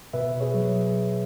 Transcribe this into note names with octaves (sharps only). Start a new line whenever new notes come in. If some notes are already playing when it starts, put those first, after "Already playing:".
B2 B4 E5
G#4 C#5
F#3